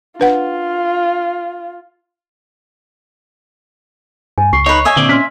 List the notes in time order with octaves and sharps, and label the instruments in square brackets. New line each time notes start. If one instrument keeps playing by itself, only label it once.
[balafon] D4 B4 F#5 [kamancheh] F4
[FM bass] G2 [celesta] G#5
[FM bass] C#2 [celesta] C#6 C7
[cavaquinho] D#4 B4 [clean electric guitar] C#5
[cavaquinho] D#5 E5 G#5
[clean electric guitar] A#2 C4 D5 [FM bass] D3
[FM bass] C#4 [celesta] C6 F6 B6